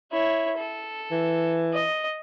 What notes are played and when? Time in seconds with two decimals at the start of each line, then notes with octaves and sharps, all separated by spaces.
0.12 E4 C#5
0.58 A4
1.11 E3
1.73 D#5